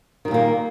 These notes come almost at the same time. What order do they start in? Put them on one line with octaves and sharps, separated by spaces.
D#3 G3 A#2 A#3